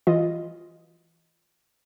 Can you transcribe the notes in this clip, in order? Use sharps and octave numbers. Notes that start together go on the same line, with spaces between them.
E3 F4 D#5